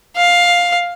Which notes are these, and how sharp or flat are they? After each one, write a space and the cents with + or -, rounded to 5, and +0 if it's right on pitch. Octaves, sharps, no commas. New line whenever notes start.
F5 +10